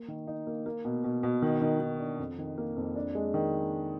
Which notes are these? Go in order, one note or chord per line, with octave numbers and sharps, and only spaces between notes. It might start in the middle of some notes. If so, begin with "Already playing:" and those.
Already playing: A#3
D#3
D#4
A#3
A#3
B2
B2
B2
D#3
D#3
D#3
D4
F2
D#3
A#3
F2
D4
G#3
D#3